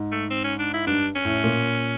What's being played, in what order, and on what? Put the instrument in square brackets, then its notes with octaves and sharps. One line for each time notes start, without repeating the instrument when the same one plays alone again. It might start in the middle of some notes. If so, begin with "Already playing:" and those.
Already playing: [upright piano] G#2
[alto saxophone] A3
C4
C#4
D4
E4
[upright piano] G2 [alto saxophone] D4
[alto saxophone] C#4
[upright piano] A2
A#2